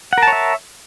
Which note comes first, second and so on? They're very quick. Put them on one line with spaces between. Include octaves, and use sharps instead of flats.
F#5 A#4 A5 C#5 E5